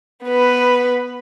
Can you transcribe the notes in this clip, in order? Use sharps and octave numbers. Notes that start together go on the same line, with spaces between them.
B3 B4